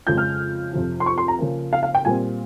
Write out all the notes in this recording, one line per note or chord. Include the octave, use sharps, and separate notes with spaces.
F2 C#3 F3 G#3 G6
F6
F2 C3 F3
C6
C#6
C6
A#5
C#3 F3 A#3
F5
F5
G5
A#2 G3 C4 G#5